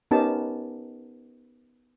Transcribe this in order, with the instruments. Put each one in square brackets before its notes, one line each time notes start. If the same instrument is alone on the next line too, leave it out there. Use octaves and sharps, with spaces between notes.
[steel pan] B3 C#4 D#4 G4 A#4 A5